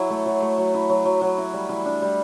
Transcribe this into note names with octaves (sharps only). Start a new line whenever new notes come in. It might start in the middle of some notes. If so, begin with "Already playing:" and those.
Already playing: F#3 E4
A3
F#3
A3
F#3
E4
F#3
F#3
F#3
E4
G3
E3
D4
G3